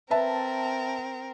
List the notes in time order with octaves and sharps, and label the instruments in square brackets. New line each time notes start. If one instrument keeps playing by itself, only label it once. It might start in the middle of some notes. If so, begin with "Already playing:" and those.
[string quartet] C4 A#4 [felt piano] B4 E5 A5